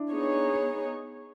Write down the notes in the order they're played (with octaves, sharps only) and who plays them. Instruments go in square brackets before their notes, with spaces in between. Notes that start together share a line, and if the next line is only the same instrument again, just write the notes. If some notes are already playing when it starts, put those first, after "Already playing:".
Already playing: [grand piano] D4 E4
[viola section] B3 D#4 G#4 C#5